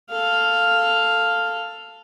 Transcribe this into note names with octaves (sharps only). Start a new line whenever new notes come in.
A4 F5